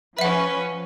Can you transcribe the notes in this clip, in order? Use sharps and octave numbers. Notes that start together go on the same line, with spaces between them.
F3 C#4 B4 E5 F#5